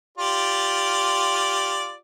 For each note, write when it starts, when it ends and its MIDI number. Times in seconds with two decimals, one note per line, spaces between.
0.18 1.95 65
0.18 1.95 67
0.18 1.95 74